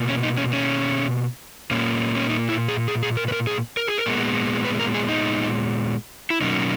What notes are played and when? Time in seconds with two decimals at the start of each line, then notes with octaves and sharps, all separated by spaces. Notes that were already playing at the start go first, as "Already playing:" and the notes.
Already playing: B2 A#3
0.09 C#4
0.23 D#4
0.37 C#4
0.53 C#4
1.71 A#2 A#3 C#4
2.15 C#4
2.29 D#4
2.49 E4
2.68 G#4
2.88 G#4
3.03 G#4
3.17 A#4
3.28 B4
3.32 A#4
3.47 G#4
3.77 A#4
3.87 G#4
3.98 A#4
4.06 A#2 G#3 B3
4.65 B4
4.79 A#4
4.94 G#4
5.09 D#4
6.30 E4
6.41 B2 F#3 A#3 C#4 D#4